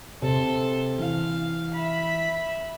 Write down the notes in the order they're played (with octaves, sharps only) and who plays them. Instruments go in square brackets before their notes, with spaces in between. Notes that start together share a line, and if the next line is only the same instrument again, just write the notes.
[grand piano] C3 [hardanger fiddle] A4 C6
[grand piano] E3 [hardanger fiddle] F5
[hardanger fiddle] E5 B5